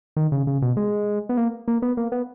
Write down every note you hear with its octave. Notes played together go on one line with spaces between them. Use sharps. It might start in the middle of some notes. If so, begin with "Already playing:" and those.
D#3
C#3
C#3
B2
G#3
B3
A#3
A#3
B3
A#3
B3